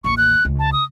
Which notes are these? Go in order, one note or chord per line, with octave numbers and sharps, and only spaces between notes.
A1 D#2 C#6
F#6
C#2
A5
D#6